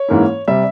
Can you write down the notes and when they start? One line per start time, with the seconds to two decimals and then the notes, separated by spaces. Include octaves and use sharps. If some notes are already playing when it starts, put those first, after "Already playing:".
Already playing: C#5
0.09 G#2 E3 A#3 C#4 E4
0.48 C3 G3 E5